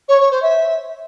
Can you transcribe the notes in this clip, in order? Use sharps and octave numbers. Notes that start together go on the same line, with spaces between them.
C#5
C#5
C5
E5